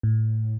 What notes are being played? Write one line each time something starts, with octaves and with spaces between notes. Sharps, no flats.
A2